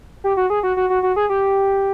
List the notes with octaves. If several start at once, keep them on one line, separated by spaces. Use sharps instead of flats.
G4
F#4
G#4
F#4
F#4
F#4
F#4
G#4
G4